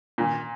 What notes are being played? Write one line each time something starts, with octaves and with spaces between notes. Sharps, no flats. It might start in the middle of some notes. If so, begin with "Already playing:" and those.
A#2